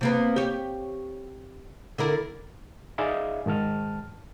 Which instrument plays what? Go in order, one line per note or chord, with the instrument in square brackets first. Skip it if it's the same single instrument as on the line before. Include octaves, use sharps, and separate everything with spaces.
[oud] C3 A#3 B3
G4 C#5
D3 E4 A#4
[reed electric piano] D#4 G#4 D5 E5 F5
G#2 D#3 A5 F6